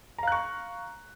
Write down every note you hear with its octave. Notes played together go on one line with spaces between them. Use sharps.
F5 A#5 C#6 F#6